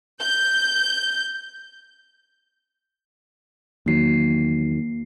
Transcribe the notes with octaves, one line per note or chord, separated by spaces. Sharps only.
G6
E2 D#3 F#3 A#3 C7